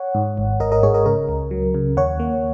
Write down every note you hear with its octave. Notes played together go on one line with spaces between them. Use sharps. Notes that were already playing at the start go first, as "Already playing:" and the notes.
Already playing: C#5 F#5
G#2
G#1
G#1 A#4 D#5
A#4 D#5
G#2 G#4 C#5
A#4 D#5
C#3 A#4
C#2
F#3
C#3
D#2 C#5 F#5
A#3